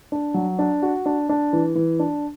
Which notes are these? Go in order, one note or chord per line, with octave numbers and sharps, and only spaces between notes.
D4
F#3
D4
F#4
D4
D4
E3
E3
D4